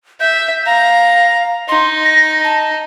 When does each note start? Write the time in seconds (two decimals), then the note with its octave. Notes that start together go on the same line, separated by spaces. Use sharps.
0.20 E5 G6
0.66 F5 A#5
1.69 D#4 C6
2.05 A#6
2.44 A5